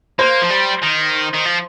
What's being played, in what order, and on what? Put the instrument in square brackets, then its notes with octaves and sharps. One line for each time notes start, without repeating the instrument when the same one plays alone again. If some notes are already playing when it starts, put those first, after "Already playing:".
[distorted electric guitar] A#3 [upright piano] C5
[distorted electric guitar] F3
G3
D#3
D#3
F3